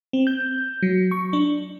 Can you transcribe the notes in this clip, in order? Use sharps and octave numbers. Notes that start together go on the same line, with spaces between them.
C4
G6
F#3
C#6
D4